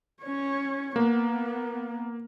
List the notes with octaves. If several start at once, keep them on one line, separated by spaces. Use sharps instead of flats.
C#4 C#5
A#3 B3